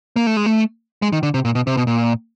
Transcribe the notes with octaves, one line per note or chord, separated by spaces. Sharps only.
A#3
A3
G#3
A3
G#3
D#3
D3
C3
A#2
B2
C3
B2
A#2